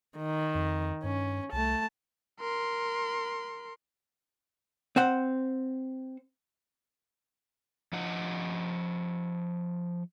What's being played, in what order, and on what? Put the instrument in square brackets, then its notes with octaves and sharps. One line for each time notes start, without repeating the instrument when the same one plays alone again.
[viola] D#3
[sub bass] F2
[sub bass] G2 [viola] C#4
[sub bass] C2 [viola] A3 A5
[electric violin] A#4 C6
[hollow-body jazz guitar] C4 C5 F#5
[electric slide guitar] F3 D#5 F#5